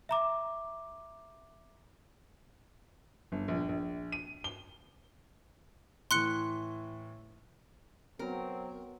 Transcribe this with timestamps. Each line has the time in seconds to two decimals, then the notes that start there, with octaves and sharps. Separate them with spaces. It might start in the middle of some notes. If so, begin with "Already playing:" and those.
0.09 E5 A#5 D6
3.32 G1
3.48 A#1
3.69 A#1
4.12 D#7
4.44 G7
6.11 A2 E3 C6 F#6 C#7
8.19 F#3 B3 C4 F#4 A#4